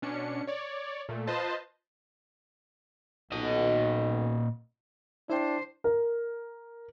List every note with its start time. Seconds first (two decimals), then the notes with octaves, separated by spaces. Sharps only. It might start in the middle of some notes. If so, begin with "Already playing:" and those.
0.02 B2 C#4 D4 C#7
0.47 C#5 D5
1.09 A#2 A3
1.27 F4 B4 C5 D#5 A5
3.32 B1 A#2 D#5
5.30 D4 E4 C5 G5
5.84 A#4